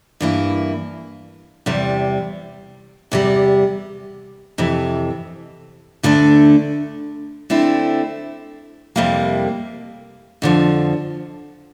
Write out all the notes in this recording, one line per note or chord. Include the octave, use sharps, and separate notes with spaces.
G2 E3 A#3 E4
E2 C3 G3
E2 C3 G3
F2 C3 E3
D2 D3 A3 D4
D3 A3 C4 E4
F2 C3 G3 A#3 E4
F2 D3 F3